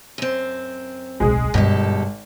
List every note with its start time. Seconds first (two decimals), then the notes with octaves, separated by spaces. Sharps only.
0.18 F#2 C4
1.20 D1 B1 G#3 G#4
1.54 G#1 G2 B2 D3 G4 A4